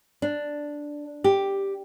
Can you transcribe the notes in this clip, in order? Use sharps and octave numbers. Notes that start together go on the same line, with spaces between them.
D4
G4